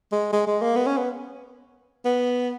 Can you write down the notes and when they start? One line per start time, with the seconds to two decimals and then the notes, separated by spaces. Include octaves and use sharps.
0.12 G#3
0.33 G#3
0.47 G#3
0.62 A#3
0.76 B3
0.87 C#4
0.97 B3
2.05 B3